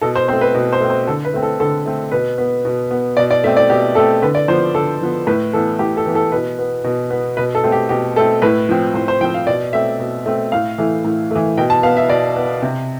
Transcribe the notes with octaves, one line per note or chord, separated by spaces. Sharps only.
B2 A4
C5
A3 C4 C5
B4
B2
C5
A3 C4
C5
D3 A4
B4
A3 C4
A4
D3 A4
A3 C4
B2 B4
B3
B2
B3
B2 D5
D5
A3 C4 E5
D5
B2 G4
A3 C4 A4
D3 B4
D5
F3 B3 C5
D3 A4
F3 B3
A2 B4
E3 B3 A4
A2 G4
A4
E3 B3
A4
B2 B4
B3
B2
B3
B2 B4
A4
A3 C4
G4
B2 G4
A3 C4 A4
A2 B4
F3 C4
A2 C5
C5
F3 C4 G5
F5
B2 D5
A3 C4 E5
B2
A3 C4
A2 F5
E3 A3
A2
E3 A3
B2 G5
A5
B3 F5
E5
B2 D5
B3
C3